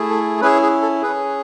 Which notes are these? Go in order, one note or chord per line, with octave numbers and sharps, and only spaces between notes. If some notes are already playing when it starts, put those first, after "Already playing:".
Already playing: A3 E4 G#4
A4
C#4 E4 G#4 B4
G#4
A4
C#4 G#4 B4